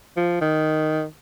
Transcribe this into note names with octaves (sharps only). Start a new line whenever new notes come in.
F3
D#3